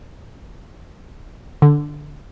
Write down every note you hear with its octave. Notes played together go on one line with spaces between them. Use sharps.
D3